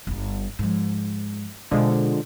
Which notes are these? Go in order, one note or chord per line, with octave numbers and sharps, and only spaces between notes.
G1 G2
G#2 F3
B2 D3 F3 G#3